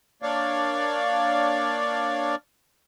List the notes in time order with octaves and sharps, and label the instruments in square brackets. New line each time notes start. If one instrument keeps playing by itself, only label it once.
[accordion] A#3 D4 C#5 D5 F5